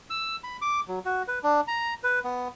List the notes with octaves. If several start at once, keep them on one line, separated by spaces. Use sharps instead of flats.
E6
B5
D6
F#3
F#4
B4
D4
A#5
B4
B3